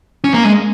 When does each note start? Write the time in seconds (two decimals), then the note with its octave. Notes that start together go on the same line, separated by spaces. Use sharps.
0.24 C#4
0.34 A#3
0.44 G#3